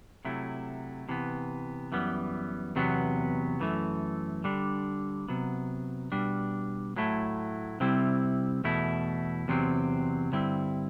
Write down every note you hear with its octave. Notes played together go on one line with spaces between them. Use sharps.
C3 F#3 A3 E4
C3 E3 B3
F#2 E3 G3 B3
E2 C3 F#3 B3
F#2 E3 A3
D3 G3 D4
C3 F#3 B3
B2 G3 D4
A2 F#3 A3 E4
C3 G3 C4 E4
E2 B2 A3 E4
E2 C3 F#3 C4
G2 D3 G3 C4 E4